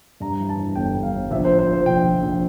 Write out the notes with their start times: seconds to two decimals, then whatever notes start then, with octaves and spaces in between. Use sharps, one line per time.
0.20 G2 A#5
0.40 E3
0.49 A5
0.57 G2
0.76 G1 G5
0.94 G2
1.03 F5
1.13 G1
1.31 A#1 E5
1.45 C5
1.50 A2
1.59 C5
1.67 F3
1.72 C5
1.86 A#1 G5
2.05 A#1
2.23 A#1